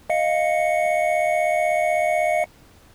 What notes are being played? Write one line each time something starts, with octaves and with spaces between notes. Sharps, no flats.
D#5 F5 C#7